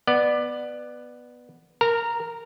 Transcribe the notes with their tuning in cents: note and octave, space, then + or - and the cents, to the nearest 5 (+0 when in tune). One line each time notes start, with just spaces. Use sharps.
B3 +0 D5 +25
A#4 +0 A#5 -20